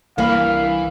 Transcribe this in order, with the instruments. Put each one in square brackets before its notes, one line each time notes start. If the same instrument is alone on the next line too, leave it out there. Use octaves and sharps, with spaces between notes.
[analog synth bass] C2 [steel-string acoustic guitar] G2 A#3 [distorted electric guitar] E3 B5 [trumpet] F5